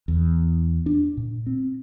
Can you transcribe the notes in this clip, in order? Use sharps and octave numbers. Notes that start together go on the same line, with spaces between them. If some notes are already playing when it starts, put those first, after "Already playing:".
E2
D4
A#2
C4